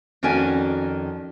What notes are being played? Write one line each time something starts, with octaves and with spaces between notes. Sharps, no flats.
F2 D#3 C#4 F#4 D5 G#5